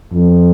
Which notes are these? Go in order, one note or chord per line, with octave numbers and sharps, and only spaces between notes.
F2